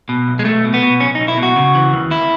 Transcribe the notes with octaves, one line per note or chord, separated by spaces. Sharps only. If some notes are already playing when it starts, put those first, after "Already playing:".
B2
B1
G#3
B1 A3
B2
B3
B2
B1 C#4
B1 D#4
E4
B2
F#4
C#3
E3
D#2
D#2 E4